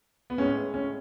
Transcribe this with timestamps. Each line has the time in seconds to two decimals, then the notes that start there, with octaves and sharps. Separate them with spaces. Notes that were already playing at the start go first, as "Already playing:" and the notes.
0.30 B3
0.38 A2 G#3 C#4
0.74 C#4